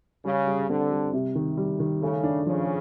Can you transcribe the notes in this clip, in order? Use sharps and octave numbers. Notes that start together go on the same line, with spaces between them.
C#3 G3
G3
D3 C4
G3
C3
D#3
G3
D#3
C#3 A3
D4
C#3 F3